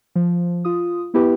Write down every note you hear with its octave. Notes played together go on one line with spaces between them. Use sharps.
F3
F4 D#6
B3 E4 G4 B4